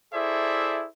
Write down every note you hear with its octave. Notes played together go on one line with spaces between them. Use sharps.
E4 G#4 A4 C5 D5 E5